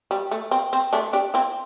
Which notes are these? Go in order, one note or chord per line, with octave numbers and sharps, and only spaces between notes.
G3
A3
C4
C4
A3 D4
D4 G4
C4 E4